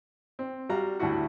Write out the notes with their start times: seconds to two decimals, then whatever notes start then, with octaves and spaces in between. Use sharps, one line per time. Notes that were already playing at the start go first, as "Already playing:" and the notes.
0.39 C4
0.69 G3 F#4 F5 A#5
0.99 D2 A2 G3 E4 F#4 F#5